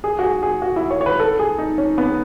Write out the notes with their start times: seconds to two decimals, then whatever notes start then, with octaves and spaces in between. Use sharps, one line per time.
0.04 G#4
0.19 F#4
0.23 G#4
0.43 G#4
0.62 F#4
0.76 E4
0.91 C#5
1.01 C#5
1.06 B4
1.19 A4
1.39 G#4
1.58 D#4
1.78 C#4
1.98 B3